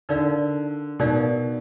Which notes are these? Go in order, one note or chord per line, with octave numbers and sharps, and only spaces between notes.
D3 D#4 A#4 D5 F5
B2 D#4 A#4 D5 F5